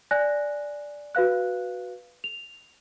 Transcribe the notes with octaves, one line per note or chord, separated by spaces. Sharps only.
D5 G#5 F#6 A#6
F#4 B4 F5 F#6
F7